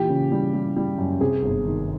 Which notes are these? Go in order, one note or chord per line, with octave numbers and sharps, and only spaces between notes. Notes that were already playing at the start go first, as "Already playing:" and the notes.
Already playing: A#2 E3 G4
C#3
G3
G3
G3
F#2
C3 G#4
G1
D#3